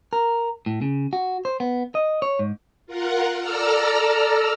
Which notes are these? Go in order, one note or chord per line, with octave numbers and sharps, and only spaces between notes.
A#4
A2
C#3
F#4
C5
B3
D#5
C#5
G#2
F4 A#4 F#5
A4 D5 A#5 E6 F6